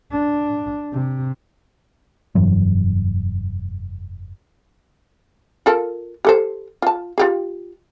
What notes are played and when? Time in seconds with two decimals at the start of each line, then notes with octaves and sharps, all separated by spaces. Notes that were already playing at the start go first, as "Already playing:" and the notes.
0.11 D4
0.92 C3
2.35 F1 G2 E3 F#3
5.66 F4 A4 A#4
6.25 G4 A4 C5
6.82 F4 A5
7.18 F4 G4 G#4